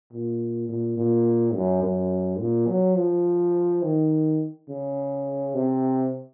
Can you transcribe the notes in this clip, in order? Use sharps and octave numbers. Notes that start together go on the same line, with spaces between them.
A#2
A#2
A#2
F#2
F#2
A#2
F#3
F3
D#3
C#3
C3